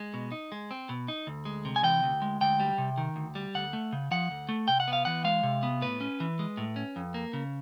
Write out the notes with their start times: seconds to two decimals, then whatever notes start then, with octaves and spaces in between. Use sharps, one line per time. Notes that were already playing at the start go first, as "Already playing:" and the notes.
Already playing: G#3
0.14 B2
0.32 D#4
0.52 G#3
0.71 C4
0.89 B2
1.08 D#4
1.27 D2
1.45 G#3
1.65 C3
1.76 G#5
1.83 E3 G5
2.03 D2
2.22 G#3
2.41 D2 G5
2.60 G3
2.78 C3
2.98 D#3
3.16 D2
3.35 G3
3.55 D2 F#5
3.73 A3
3.93 C#3
4.11 F3 F#5
4.31 D2
4.49 A3
4.68 C3 G5
4.80 F#5
4.88 B3
4.93 F5
5.05 E3 F#5
5.24 G#3 F5
5.43 C3
5.63 B3
5.82 A2 B4
6.01 C#4
6.20 E3
6.39 G#3
6.57 A2
6.76 C#4
6.96 F2
7.14 A#3
7.33 C#3